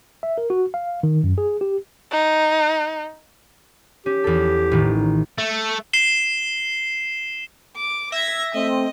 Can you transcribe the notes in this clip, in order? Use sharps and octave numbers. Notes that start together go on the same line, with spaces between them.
E5
A#4
F#4
F5
D#3
F#2
G#4
G4
D#4
C#4 G4
E2 A4
A1 D#3
A3
C7 E7 G7
D6
E5 G#6 A#6
A3 C4 D#5